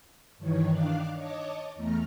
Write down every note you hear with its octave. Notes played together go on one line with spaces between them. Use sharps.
G2 D#3 E3 C#5
D#3 D4 F5 D6 F#6
C#5 D#5 A5 D6
E2 A3 A#5 F6